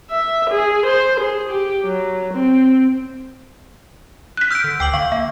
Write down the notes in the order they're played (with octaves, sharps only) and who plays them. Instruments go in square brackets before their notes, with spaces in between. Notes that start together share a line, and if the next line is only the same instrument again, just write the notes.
[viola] E5
G#4
C5
G#4
G4
F#3
C4
[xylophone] F#6 B6
[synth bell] E6 G6 B6 [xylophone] F6 D7
[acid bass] D3
[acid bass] D2 [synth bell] G5 D6 F#7
[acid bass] D3 [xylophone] F5 [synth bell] C#6
[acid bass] A#3 [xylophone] E5